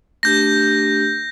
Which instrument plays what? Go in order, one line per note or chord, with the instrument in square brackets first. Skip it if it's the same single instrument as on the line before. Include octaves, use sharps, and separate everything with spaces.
[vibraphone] A3 D4 G4 [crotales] G6 A#6